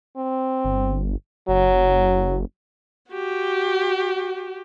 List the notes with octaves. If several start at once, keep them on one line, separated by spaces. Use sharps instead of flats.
C4
G1
F#1 F#3
F#4 G4